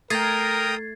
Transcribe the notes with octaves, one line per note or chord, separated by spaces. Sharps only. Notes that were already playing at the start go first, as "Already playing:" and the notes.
A3 A#4 G5 A#5 D#6 G#6 A6 C7